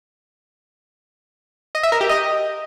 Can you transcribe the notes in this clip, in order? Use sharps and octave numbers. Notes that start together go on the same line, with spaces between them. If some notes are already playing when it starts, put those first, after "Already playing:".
D#5
E5
A#4
G4
D#5